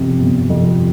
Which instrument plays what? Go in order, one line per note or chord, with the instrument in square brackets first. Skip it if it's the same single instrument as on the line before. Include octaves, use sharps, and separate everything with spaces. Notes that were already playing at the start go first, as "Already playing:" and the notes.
Already playing: [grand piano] G1 F2 C3
G1
F2 C3